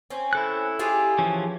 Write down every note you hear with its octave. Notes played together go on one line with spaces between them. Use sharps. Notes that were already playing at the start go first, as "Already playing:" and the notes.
C4 C#4
E4 A4 F#6
F4 G4 G#4
E3 F3 C#4